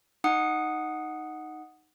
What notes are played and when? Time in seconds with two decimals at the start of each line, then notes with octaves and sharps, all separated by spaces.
0.24 D#4 F#5 D#6 C#7